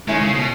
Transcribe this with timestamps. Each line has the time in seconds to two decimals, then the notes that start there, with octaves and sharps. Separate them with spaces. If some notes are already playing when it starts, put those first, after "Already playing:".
0.08 D#3 G#3 A3 C#4 E4
0.21 C#3
0.35 B2